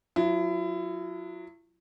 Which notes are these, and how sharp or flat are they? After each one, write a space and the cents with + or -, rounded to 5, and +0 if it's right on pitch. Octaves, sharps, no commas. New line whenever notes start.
F#3 -30 E4 +30